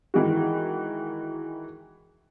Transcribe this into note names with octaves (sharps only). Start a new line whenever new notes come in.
D#3 E3 G#3 F#4